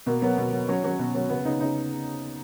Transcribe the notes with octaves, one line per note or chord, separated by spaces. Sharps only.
B2 A#3
F#3 B3
B2
F#3
F#3 C#4
F#3 C#4
B2
F#3
C#3 B3
C#3 D#4
C#3 D#4